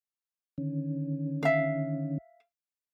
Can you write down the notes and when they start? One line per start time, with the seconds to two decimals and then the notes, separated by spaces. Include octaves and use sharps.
0.58 D3 D#3 C#4
1.43 E5 F5